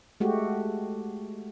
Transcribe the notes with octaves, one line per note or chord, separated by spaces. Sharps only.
G#3 A3 F#4 G4